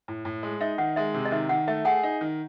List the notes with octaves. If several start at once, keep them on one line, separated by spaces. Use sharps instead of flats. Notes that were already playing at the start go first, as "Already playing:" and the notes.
A2
A2
G#3
D#4 E5
D#3 F#5
G#3 E5
C3
D#5
D#3 E5
D#3 F#5
A3 E5
G#4 F#5
D#4
D#3